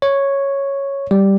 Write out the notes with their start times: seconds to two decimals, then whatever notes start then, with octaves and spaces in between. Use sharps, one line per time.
0.02 C#5
1.11 G3